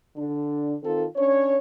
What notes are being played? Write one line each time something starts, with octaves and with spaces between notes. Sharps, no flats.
D3 D4
D#3 C4 F4 A4
C#4 D4 C#5